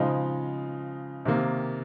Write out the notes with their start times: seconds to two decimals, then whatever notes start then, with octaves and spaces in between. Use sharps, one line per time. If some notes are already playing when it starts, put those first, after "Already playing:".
Already playing: C#3 F3 G#3 D#4
1.25 C3 D#3 A#3